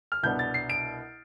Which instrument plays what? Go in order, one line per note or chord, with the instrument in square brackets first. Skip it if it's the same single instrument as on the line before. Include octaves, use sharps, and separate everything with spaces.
[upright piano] F6
C2 B2 B3 D4 G6
A6
C7
D7